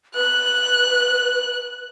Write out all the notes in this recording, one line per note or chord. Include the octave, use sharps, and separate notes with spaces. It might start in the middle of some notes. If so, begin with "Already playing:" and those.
B4 F#6